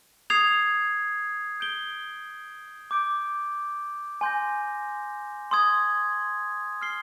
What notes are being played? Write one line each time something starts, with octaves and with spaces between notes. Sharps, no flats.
D#6 G#6 C7 F7
G6 D7 G7
D6 G6 D7
G#5 C6 G6 A#6
C6 D#6 G#6
F6 C7 G7